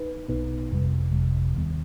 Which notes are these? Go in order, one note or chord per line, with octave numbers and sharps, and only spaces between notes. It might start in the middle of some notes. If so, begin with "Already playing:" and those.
Already playing: D#4 B4
B1 B2 B3 D#4 B4
G1 F2 C3 G3
G1 F2 C3 G3
D#2 D#3 B3